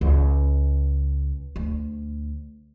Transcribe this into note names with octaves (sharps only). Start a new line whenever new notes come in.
C#2
D2